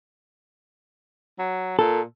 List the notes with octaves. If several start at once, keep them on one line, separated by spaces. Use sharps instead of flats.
F#3
A#2 A4